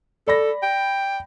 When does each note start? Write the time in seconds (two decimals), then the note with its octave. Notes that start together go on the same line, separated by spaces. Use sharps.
0.28 A4 D5 B5 A#6
0.63 G5